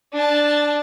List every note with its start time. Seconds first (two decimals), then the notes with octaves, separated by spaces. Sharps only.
0.13 D4 A5